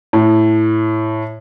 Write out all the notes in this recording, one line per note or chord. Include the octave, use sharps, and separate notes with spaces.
A2